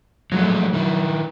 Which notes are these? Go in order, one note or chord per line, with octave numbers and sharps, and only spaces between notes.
F3 F#3 G#3 A3
D#3 E4